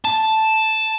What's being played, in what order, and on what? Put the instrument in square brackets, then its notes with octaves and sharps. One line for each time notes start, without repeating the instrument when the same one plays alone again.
[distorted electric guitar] A5